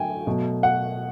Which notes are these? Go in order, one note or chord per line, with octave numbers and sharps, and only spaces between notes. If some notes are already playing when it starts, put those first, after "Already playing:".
Already playing: D3 F#3 A3 G5 G#5
B2 F#3 A3
F#5